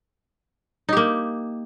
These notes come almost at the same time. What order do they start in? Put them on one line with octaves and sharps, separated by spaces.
D#4 G4 A#3